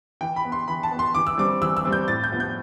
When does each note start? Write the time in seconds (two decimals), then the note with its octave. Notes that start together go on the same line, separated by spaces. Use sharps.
0.21 E3 G5
0.36 B5
0.44 B3
0.52 C6
0.68 E3 B5
0.83 A5
0.91 B3
0.99 C6
1.14 E3 D6
1.27 E6
1.38 G3 C4 D6
1.61 E3 E6
1.77 E6
1.85 G3 C4
1.92 G6
2.08 A2 A6
2.24 G6
2.32 F3 B3
2.40 G6